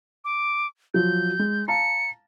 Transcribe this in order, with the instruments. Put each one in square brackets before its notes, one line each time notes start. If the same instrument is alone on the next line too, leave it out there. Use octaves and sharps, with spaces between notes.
[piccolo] D6
[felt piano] F3 F#3 [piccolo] G6
[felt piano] G#3
[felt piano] F5 A5 A#5 [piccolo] C#7